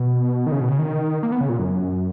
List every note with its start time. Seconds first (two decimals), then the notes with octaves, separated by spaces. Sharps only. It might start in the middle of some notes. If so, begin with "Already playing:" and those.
Already playing: B2
0.46 D#3
0.52 C#3
0.61 B2
0.69 C#3
0.79 D#3
1.23 A#3
1.32 B3
1.41 C#3
1.49 A#2
1.59 F#2